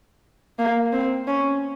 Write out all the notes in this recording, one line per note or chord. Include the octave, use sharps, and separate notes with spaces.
A#3
C4
C#4